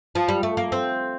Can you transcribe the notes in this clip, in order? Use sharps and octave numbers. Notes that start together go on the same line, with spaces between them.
F3
G3
A3
A#3
C4